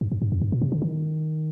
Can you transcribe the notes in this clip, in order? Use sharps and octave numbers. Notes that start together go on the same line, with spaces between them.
G2
G2
G2
F2
G2
A#2
C3
D3
D#3